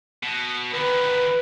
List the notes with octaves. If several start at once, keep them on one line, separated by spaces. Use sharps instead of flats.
B2
D3 D#3 B4